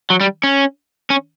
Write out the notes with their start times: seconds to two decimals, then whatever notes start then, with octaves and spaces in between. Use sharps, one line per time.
0.10 F#3
0.21 G3
0.43 C#4
1.10 C#4